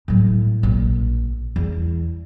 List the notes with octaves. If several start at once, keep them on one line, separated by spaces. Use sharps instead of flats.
A2 F#3
A#1
E2